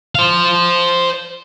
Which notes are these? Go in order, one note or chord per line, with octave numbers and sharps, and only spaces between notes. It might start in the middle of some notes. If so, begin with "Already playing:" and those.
C5 F5